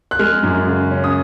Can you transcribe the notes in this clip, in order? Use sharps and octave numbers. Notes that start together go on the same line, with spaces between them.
F#6
G#3 F6
F#2
C#3
C#4
D#6